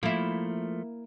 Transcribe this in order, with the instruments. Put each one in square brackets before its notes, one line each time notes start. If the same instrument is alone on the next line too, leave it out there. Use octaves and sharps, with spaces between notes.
[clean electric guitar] F3 A3 [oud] A#3 E4